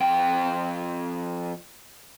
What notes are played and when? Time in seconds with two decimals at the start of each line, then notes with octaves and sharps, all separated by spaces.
0.01 F2 G5